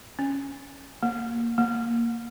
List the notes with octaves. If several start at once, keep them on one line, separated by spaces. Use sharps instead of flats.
C#4
A#3
A#3